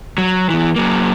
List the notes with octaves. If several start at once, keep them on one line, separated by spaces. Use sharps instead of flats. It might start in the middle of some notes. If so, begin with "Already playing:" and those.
F#3
E2 E3
F#3 A#3